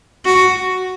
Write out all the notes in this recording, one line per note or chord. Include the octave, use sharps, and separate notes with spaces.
F#4